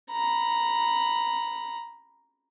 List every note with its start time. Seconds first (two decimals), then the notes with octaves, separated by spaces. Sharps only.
0.11 A#5 B5